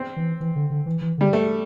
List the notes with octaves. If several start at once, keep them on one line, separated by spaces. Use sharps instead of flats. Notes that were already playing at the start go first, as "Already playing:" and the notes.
Already playing: C4
E3
E3
D3
D3
E3
E3
D3 G3
A3